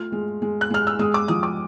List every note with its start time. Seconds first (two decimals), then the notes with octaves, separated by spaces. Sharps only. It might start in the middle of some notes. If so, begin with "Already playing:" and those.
Already playing: A3 F4 F6
0.12 G#3
0.42 G#3
0.61 F#6
0.70 G#3 F6
0.87 E6
0.99 G#3 D#6
1.14 D6
1.28 F3 D#6
1.43 D6